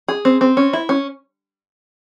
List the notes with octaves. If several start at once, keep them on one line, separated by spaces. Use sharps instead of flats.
G#4
C4
C4
C#4
E4
C#4